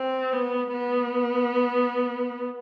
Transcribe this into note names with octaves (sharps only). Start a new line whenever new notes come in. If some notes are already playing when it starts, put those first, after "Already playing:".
Already playing: C4
B3
B3